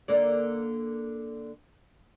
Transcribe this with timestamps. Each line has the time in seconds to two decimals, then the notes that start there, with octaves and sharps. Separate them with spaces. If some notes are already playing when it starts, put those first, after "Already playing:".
0.08 D3 A#3 D5